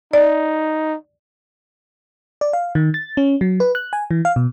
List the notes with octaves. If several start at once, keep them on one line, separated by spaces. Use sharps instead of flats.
D#4 D5
D5
F5
D#3
A6
C#4
F#3
B4
F#6
G#5
E3
F5
B2